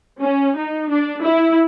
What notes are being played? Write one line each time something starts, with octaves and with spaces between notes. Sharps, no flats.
C#4
D#4
D4
E4